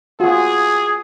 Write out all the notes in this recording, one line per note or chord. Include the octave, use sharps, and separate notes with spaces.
F4 F#4 G#4